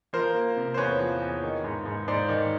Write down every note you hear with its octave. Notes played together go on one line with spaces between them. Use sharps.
F3 A#4 C5
A#3
C3
C5
E2 B4 C#5
F3
E2
D#3
G#2
G#2
G#2 C5 D5
D#3